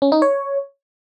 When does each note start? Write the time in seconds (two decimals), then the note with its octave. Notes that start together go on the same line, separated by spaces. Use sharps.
0.02 C#4
0.12 D#4
0.22 C#5